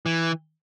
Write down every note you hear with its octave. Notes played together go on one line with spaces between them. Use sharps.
E3